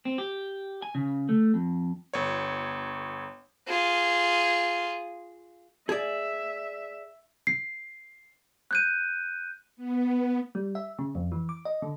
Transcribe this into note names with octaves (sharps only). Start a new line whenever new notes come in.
C4
G4
G#5
C#3
A3
F2
G1 C#5
F4 G#4
G#4 D5 E5
C7
F#6 G6 D#7
B3
G3
E5
C#3
F2
E3
D6
D#5
D3